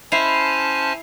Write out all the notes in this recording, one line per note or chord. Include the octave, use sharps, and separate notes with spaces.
C#4 E4 C5 E5 G#5 A5 C7 F7